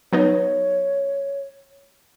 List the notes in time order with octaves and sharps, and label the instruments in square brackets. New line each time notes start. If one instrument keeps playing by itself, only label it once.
[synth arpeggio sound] F#3 B3 D#4 [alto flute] C#5